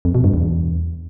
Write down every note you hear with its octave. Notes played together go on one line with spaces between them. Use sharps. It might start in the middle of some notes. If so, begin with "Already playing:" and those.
F2
B2
G2
E2